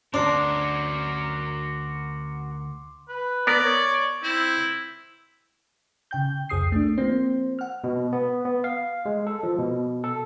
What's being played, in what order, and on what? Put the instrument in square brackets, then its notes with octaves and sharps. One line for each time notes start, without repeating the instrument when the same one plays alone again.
[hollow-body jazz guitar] D2 C5 [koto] D4 [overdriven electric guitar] F#4 A#4 [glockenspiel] C6 D6 C7
[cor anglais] B4
[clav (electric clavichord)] B3 A#4 [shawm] D5
[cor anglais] C#5
[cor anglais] C4 [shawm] E4
[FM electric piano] C#3 G5 G6
C2 F2 G#4 D#6 C7
A3 D4
F3 A#3 C4 C5
F#5 F6
[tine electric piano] B2
B3
B3
F5
G#3
A4
F3
B2
A4